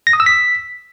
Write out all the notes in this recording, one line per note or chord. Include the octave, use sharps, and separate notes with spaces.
A#6
D#6
E6
B6